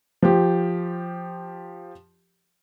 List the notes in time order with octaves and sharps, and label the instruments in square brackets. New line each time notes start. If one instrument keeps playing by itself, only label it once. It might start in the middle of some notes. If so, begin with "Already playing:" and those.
[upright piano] F3 G4